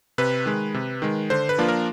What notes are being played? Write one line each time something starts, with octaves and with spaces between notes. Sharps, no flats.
C3 B4
D#3 G#3
C3
D#3 G#3
D3 C5
B4
F3 A#3 D4 F4
A#4